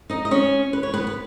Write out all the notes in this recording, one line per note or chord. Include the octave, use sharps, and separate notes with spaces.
D#4 D#5
D#5
C#4 C#5
B4
C#5
B3 B4
B4